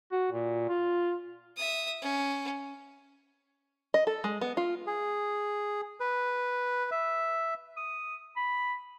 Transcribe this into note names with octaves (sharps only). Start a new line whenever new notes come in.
F#4
A#2
F4
E5 D#6
C#4
D#5
A4
G#3
B3
F4
G#4
B4
E5
D#6
B5